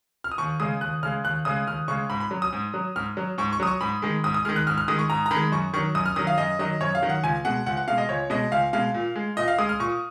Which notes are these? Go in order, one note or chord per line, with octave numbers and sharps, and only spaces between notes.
F6
D#6
D#2 C#6
C#3 G#3 D#6
D#2 F#6
C#3 G#3 F6
D#2 F#6
C#3 G#3 D#6
D#2 F6
C#3 G#3 C#6
G#2 B5
B5
F#3
D#6
G#2
F#3
G#2 F6
F#3
G#2 C#6
C#6
F#3 D#6
C#6
G#2 B5
D#3 G#3
G#2 D#6
D#6
D#3 G#3 F6
F#6
G#2 F6
F6
D#3 G#3 D#6
C#6
G#2 A#5
A#5
D#3 G#3 B5
F#2 C#6
D#3 F#3 C#6
F#2 D#6
F6
D#3 F#3 D#6
F5
F#2 D#5
D#3 F#3 D#5
F#2 C#5
F5
D#3 F#3
F#5
C#2 G#5
B2 G#3 F#5
C#2 F#5
F#5
B2 G#3 F5
D#5
C#2 C#5
B2 G#3 D#5
C#2 F5
B2 G#3 F5
A#2
G#3
A#2 D#5
F5
G#3 D#6
F6
A#2 C#6